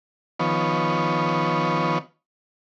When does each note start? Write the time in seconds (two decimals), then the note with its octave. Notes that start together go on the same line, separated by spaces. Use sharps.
0.40 D#3 F3 B3 C#5